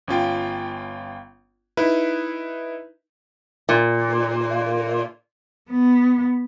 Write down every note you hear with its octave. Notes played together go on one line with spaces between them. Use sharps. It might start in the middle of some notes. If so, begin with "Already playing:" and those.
G1 C#4 F4 G5
D#4 E4 B4
A#2
B3